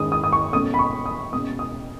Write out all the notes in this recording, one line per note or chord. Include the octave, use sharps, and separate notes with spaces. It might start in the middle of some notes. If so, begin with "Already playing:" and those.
Already playing: G#2 D#3 G#3 C#4 D#6
D#6
D#6
C#6
B2 A3 C#4 D#6
B5
C#6
D#6
B2 G#3 C#4 D#6
D#6